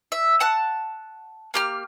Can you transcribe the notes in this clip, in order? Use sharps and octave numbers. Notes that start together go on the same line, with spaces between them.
E5
F#5 A5 F#6
A#3 G4 F6